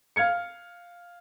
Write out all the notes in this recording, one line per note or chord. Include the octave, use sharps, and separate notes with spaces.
F5 F6 G#6 C#7